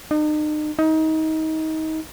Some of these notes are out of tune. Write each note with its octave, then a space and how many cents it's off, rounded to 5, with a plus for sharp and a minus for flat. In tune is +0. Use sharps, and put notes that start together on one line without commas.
D#4 -40
D#4 +25